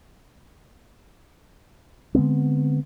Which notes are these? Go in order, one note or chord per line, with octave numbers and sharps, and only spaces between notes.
D3 G#3 B3 C4